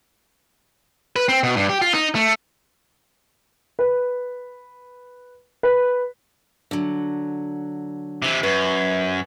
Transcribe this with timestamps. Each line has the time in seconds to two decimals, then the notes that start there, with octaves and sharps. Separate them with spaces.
1.16 B4
1.29 C4
1.43 B2
1.56 G2
1.69 G4
1.81 F4
1.94 D#4
2.15 A3
3.79 B4
5.63 B4
6.71 D3 F#3
8.22 C3 E3
8.43 F#2 B4